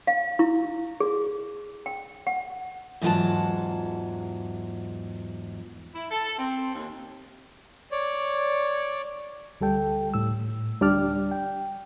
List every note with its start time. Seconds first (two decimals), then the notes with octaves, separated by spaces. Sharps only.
0.07 F5
0.39 E4
1.00 G#4
1.86 G5
2.27 F#5
3.02 E2 G#2 F#3 F4 F#5 A5
5.94 E4
6.11 A4
6.38 C4
6.74 D#2
7.91 C#5 D5
9.61 D2 G3 A4 G5
10.14 A2 E6
10.81 D2 G3 D4 G4 D5 F6
11.31 G5